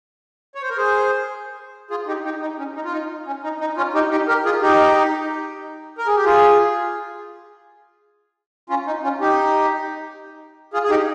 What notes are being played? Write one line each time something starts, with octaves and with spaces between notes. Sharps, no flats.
C#5
C5
A#4
G#4 C5
F4 G#4
D#4 G4
D#4 G4
D#4
C#4
D#4
F4
D#4
C#4
D#4
D#4
C#4 F4
D#4 G4
D#4 G4
G4 A#4
F4 G#4
D#4 G4
A#4
G#4
G4
F4 G#4
C#4 F4
D#4
C#4 F4
D#4 G4
F4 G#4
G#4
D#4 G4